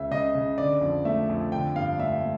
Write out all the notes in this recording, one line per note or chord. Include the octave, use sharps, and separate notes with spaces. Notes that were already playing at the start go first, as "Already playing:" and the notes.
Already playing: C#2 C#3 E5
C#3 D#5
C#3
D3 D5
F2
A3 E5
F2
D3 G5
G2 F5
A3 E5
A3